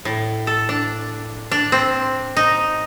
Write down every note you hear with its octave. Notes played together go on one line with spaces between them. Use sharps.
A2
A4
D4
D4
C4
D#4